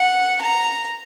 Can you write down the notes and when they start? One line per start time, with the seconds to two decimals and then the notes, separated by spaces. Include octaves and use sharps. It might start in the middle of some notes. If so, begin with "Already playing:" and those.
Already playing: F#5
0.42 A#5